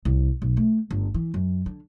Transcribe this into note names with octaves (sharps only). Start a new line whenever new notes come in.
C2
B1
A3
G1
E3
F#2
D3